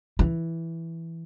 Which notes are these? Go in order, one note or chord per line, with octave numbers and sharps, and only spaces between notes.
E3